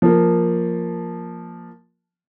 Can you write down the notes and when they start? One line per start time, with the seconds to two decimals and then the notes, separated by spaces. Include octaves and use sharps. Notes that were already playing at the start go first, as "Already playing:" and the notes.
0.02 F3 A#3